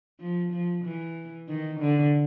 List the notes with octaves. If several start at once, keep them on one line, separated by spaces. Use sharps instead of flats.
F3
F3
E3
D#3
D3